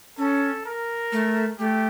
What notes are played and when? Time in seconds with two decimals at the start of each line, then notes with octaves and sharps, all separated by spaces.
0.18 C#4 A4
0.65 A#4
1.12 A3
1.59 A3 G4